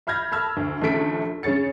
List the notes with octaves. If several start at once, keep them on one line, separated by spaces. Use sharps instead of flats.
E5 B5 F6 G6 G#6 A#6
A5 B5 E6 F6 G#6
D2
A#1 D#2 C#3 A3 B6 D7
C#3 G#4 C#5 A6 C#7